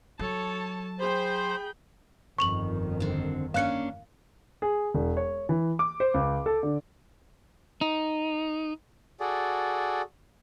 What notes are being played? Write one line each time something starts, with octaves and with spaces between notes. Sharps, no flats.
F#3 A4 C#5 A5
G#4 C5 G5 B5
G1 F2 D#3 C#6 F7 F#7
D3 C4
A#3 C#4 D4 F5 F#6 C#7
G#4
E1
C#5
E3
D6
C5
C#2
A4
D3
D#4
F#4 G#4 A4 D5